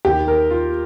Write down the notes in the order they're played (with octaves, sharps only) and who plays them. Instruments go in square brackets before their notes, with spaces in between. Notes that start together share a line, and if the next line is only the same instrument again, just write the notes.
[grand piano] D#2 D#3 G4
A#4
F4